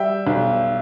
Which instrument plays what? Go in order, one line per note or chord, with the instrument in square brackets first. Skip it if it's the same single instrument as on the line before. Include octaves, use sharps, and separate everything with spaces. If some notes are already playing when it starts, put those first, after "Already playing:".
Already playing: [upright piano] G3 E5 G5
B1